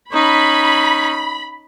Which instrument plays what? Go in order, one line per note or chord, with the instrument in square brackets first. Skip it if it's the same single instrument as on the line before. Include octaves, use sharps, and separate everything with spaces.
[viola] C#4 D#4 [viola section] B5